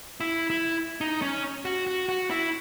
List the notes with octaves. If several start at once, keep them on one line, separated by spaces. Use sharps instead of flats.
E4
E4
D#4
C#4
F#4
F#4
F#4
E4